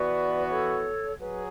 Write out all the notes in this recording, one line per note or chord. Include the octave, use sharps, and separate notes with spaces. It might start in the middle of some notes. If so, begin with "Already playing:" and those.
Already playing: E3 B3 F#4 B4 D5
A4 C#5
F#3 G#4 B4